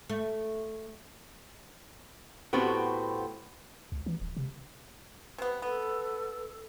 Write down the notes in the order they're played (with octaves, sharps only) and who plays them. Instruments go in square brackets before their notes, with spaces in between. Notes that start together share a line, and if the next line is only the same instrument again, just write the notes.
[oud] A3
[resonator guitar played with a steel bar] A2 B3 C4 F#4 G4
[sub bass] C#2
E3
D1
C3
[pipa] C3 B3 [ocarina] B4
[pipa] B3 [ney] A4